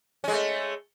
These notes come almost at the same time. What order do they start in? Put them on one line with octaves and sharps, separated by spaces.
C#4 G#3 A3